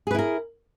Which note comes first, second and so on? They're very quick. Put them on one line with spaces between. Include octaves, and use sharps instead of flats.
G#4 B4 E4 A#4